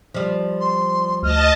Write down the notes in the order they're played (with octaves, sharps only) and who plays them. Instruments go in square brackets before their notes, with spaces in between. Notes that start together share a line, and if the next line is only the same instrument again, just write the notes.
[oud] F3 G3
[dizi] C6
[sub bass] D2 [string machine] D#5 A5 [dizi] F6